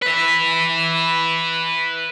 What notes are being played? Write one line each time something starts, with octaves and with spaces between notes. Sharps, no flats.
B4 E5